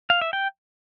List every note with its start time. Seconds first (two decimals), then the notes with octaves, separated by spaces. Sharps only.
0.10 F5
0.21 E5
0.33 G5